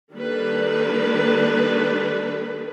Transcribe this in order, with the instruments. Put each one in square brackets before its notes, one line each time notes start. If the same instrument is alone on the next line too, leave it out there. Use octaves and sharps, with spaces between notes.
[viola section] D#3 G3 A#3 D4 A4 B4